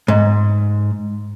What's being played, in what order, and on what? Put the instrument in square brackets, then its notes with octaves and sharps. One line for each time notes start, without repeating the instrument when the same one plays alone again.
[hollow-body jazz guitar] G#2